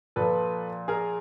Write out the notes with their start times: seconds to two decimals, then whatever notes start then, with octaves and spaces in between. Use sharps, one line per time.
0.16 A#2 F3 A4 B4
0.88 G#4 A#4